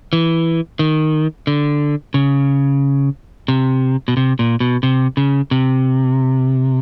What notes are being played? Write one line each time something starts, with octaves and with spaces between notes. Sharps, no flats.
E3
D#3
D3
C#3
C3
B2
C3
A#2
B2
C3
C#3
C3